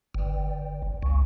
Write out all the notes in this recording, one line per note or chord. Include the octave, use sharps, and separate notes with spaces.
G1
C#2